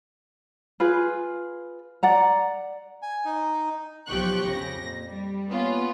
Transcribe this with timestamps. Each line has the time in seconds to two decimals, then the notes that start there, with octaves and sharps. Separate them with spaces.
0.80 F4 G#4 B4
2.03 D5 F#5 A#5
3.02 G#5
3.25 D#4
4.07 B1 F3 G4 G5 C#6 F#6
4.48 F2 C#3 A#6
4.81 A#2
5.09 G3
5.50 A#3 B3 C#4 F4